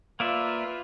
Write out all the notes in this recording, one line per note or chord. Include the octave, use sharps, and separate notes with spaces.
A#3 F4 B4 D5 E5